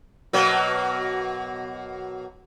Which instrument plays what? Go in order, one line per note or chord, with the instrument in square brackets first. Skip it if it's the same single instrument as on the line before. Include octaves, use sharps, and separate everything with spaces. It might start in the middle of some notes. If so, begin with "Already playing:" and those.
[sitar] B2 F#3 A#3